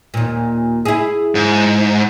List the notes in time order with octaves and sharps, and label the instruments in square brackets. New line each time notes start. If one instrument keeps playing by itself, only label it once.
[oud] D#2 A#2
E4 G#4
[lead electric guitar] G#2